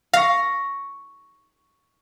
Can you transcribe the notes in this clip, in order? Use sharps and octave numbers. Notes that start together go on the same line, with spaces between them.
F5 C#6 A#6